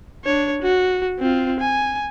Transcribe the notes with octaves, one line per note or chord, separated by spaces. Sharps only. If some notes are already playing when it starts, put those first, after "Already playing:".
D4 C#5
F#4
C4 F4
G#5